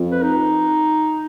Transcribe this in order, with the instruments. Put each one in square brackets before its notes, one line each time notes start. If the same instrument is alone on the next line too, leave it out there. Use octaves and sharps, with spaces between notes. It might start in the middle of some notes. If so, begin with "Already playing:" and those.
Already playing: [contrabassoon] F2
[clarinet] B4
D#4